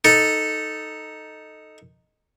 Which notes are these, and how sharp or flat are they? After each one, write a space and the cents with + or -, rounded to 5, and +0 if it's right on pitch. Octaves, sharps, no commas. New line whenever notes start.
D#4 +0 A4 +0